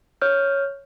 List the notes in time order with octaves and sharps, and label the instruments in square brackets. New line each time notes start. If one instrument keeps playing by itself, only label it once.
[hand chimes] C#5 F6 G6